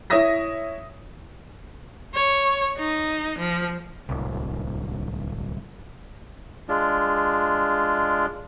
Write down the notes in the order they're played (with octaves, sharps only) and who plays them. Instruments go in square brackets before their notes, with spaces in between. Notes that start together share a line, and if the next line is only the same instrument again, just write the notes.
[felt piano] E4 C#5 E5 D#6 A#6 B6
[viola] C#5
D#4
F3
[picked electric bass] D1 C2
[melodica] G#3 D4 F4